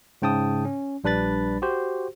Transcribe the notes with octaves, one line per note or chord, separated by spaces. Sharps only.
G#2 C#3 G5 A5 D#6
C#4
A#1 G3 D4 B4 B5 A6
F#4 G4 C5